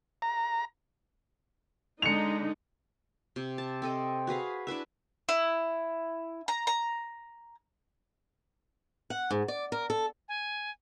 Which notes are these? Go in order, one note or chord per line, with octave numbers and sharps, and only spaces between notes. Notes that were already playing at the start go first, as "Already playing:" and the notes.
A#5
D3 G#3 D#4 C#7 F7
C3
A5
C4 A4 D#5
F#4 G#4 B4 F5
D4 E4 B4 E5
E4
A#5
A#5
F#5
G#2
D5
A#4
A4
G#5